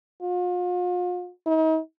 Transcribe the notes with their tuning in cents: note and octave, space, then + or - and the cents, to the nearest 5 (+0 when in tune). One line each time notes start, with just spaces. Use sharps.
F4 +40
D#4 +40